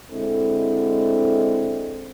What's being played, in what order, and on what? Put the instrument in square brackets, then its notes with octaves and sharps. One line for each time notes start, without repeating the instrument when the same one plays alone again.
[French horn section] D3 G#3 C4 E4 A4